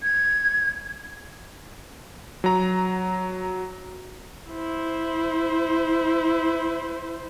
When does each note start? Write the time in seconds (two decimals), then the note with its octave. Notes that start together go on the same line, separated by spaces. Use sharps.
0.03 G#6
2.44 F#3 A#5
4.51 E4 C5